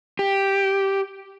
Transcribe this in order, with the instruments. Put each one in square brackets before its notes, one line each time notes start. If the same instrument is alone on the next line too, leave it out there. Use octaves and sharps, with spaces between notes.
[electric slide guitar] G4